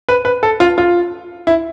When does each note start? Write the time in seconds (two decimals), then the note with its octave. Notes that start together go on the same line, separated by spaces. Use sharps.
0.09 B4
0.25 B4
0.43 A4
0.60 F4
0.78 F4
1.47 E4